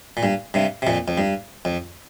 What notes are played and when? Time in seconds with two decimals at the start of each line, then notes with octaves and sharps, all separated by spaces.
0.17 A#2
0.23 G2
0.54 G2 C3
0.82 C3
0.87 F2 A#2
1.08 F2
1.18 G2
1.65 F2